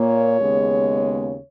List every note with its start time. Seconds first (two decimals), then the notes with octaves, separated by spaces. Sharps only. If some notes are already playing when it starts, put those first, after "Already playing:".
Already playing: A#2 A#3 C#5
0.39 D#2 C#3 G#3 B3